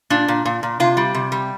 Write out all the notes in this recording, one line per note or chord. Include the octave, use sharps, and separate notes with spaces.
A#2 D4
A#2
A#2
A#2
C3 F4
G3
C3
G3